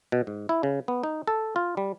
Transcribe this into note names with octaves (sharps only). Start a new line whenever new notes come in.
B2
G#2
E4
C#3
B3
D#4
A4
F4
G3